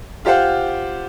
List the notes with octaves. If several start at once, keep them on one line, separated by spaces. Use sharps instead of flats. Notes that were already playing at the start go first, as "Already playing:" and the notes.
F4 G4 C5 F5 F#5